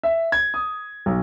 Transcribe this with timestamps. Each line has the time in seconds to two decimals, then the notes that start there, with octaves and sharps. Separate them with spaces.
0.03 E5
0.32 G#6
0.54 D#6
1.06 B1